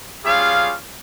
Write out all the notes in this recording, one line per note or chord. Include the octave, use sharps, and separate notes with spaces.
G3 C#4 F4 G#4 F5